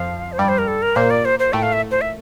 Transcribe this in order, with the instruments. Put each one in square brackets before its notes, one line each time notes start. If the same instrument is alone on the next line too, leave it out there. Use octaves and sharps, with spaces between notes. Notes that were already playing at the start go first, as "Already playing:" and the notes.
Already playing: [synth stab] F2 F3 [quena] F5
[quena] C5
[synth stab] G2 G3 [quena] D5
[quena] C5
A#4
A4
A#4
[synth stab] A#2 A#3 [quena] C5
[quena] D5
C5
C5
[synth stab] A2 A3 [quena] G5
[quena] F5
E5
C5
E5